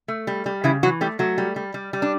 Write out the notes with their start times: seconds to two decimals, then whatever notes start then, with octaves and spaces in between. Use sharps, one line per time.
0.08 A3
0.27 G3
0.46 G3
0.64 C#3 E3 E4
0.83 E3 F#3 F#4
1.01 G3 A3 G4
1.19 F#3 A3 F#4
1.38 G3
1.56 G3
1.74 G3
1.93 G3
2.02 D4